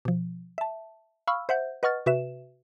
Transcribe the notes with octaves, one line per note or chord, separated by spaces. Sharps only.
B2 F3
E5 A5
F5 B5 C#6 E6 F6
C5 E5 F#5 G6
B4 D#5 F#5 C#6 F6 A6
C3 F#4 B4 E5 E7